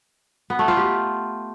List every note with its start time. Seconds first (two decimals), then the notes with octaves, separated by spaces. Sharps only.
0.50 B3
0.59 A3
0.68 F4
0.77 G4